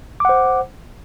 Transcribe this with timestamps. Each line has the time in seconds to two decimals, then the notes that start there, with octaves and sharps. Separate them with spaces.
0.20 D6
0.25 F#5
0.29 C5